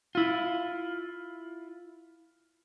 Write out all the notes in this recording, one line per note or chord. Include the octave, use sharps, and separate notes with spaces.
E4 F4